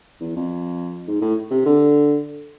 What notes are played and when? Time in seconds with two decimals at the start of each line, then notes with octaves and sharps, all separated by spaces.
0.21 E2
0.36 F2
1.08 G#2
1.21 A2
1.51 C3
1.65 D3